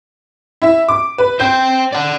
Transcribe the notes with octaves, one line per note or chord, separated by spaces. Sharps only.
E4 E5
D6
B4
C5 G5 G6
D5 F#5